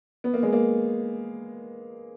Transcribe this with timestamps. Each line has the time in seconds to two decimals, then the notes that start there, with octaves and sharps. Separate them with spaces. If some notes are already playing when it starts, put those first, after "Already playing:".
0.24 B3
0.34 A#3
0.43 G#3
0.52 A#3